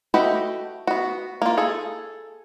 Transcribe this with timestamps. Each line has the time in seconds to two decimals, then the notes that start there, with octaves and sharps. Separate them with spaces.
0.14 A3 F#4 G4 B4 D#5
0.87 B3 F#4
1.42 A#3 F4
1.57 G#4 A4